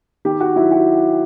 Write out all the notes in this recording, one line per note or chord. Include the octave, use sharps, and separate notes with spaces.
D#3 G4
F#4
F#3 E4
F#4